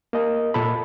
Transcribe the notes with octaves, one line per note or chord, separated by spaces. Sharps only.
A#3 D#5
A#2 A4 B5